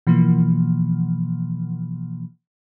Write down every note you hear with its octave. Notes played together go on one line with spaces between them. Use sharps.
B2 E3 F3 A#3